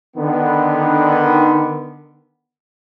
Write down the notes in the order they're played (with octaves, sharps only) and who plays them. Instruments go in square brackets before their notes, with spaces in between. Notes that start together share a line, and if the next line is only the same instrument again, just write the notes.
[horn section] D3 D#3 B3